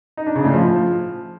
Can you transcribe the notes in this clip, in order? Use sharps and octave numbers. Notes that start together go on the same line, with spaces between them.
D#4
D4
C#3
A2
F3